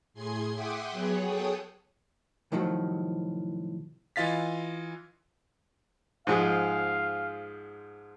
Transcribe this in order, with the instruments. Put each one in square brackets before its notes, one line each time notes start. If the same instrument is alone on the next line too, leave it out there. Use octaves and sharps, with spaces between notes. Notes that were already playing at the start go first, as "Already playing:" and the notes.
[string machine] A2 G#4 C6 G#6 C7
E5 F#5 G5 C6 D6 D#6
F#3 B3 G#4 C#5 F#5
G#4 A4 C#5 G5 D#6
[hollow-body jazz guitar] C2 A2 D#3 F3 F#3
[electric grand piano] E3 F4 D#5 F5 A6 B6
[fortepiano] G#2 F3 G#3 [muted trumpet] F5